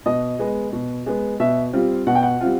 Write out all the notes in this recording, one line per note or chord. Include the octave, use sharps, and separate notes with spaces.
B2 D#5
G#3 B3
B2
G#3 B3
B2 E5
G3 C4 F4
B2 F#5
G5
F#5
G3 C4 F4